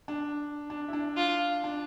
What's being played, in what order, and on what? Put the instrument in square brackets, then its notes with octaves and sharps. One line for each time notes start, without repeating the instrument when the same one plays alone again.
[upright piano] D4
D4
E4
D4
[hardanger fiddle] F4
[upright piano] D4